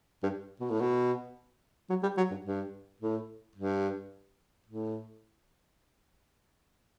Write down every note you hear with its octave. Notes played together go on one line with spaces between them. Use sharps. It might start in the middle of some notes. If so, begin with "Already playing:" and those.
G2
B2
A2
B2
F#3
G3
F#3
G2
G2
A2
G2
A2